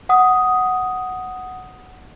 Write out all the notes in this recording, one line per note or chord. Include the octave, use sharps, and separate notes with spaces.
F#5 D#6